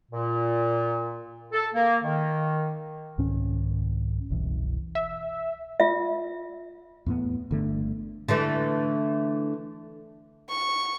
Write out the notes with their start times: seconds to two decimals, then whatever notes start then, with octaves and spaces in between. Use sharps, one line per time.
0.12 A#2
1.53 A4
1.75 A#3
2.03 D#3
3.18 C2 G#2 D#3 C#4
4.30 F#1 C2 B2 E3
4.95 E5
5.80 F4 E5
7.06 E2 A2 B3
7.51 G1 D3 A3
8.28 D3 E3 A3
10.50 C#6